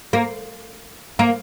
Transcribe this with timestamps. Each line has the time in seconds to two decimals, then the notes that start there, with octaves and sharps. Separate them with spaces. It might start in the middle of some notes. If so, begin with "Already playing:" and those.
0.13 A#3
1.19 A#3